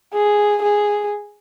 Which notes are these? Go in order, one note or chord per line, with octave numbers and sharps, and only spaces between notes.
G#4
G#4